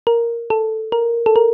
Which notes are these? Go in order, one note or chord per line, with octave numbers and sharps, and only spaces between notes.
A#4
A4
A#4
A4
A#4